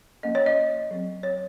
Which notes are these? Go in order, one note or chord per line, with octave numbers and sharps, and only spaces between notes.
F3 A#3 C#4 D#5
C#5
D#5
F#3 C4
C#5